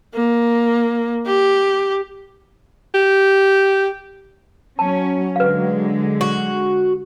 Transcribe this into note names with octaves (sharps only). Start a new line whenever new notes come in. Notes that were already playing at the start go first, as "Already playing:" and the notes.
A#3
G4
G4
F#3 C#4 A5
D3 G#3 B4 F5
F#4